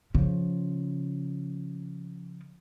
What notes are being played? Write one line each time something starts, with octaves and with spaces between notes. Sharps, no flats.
C#3 F3